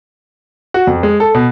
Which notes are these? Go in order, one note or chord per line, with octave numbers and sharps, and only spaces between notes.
F#4
F2
G#3
A4
B2